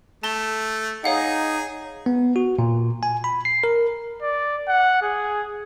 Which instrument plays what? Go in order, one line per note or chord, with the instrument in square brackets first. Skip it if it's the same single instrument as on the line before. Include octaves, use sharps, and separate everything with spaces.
[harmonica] A3 [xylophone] A5 A6 G7
[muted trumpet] D#4 [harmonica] G#4 [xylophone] C#5 F5 F#5
[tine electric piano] B3
F#4
A#2
G#5
B5
C7
A#4
[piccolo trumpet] D5
F#5
G#4